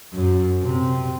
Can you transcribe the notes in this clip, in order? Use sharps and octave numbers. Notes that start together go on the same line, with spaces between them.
F#2
C3